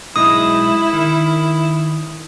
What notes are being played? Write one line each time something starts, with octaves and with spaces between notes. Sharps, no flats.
B1 G#3 D#4 E4 D#6
D#3